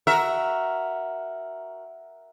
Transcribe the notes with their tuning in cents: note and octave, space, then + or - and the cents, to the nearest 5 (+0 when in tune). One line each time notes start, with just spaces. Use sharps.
F#4 +0 A#4 +5 E5 +0